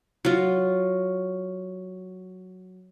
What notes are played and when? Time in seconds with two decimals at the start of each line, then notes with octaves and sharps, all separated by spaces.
0.25 F#3 F4